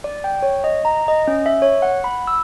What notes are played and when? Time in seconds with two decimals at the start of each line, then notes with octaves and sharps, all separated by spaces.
0.04 D5
0.24 G5
0.42 C#5
0.64 D#5
0.85 A#5
1.08 D#5
1.28 C#4
1.46 E5
1.62 C#5
1.82 F#5
2.04 B5
2.27 E6